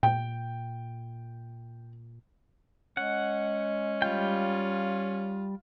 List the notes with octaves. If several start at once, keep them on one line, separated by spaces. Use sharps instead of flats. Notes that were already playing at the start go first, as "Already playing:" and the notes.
A#2 G5
G#3 C#4 F#5
G3 F4 G5